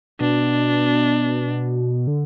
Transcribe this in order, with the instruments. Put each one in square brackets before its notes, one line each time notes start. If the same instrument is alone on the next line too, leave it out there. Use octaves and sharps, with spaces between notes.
[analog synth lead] B2 [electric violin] D4
[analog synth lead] D3